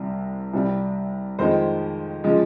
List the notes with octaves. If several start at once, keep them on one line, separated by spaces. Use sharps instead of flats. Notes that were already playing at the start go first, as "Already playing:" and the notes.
Already playing: C2 C3 G3
C2 C3 G3
F2 D#3 G#3 C5
C#3 F3 G#3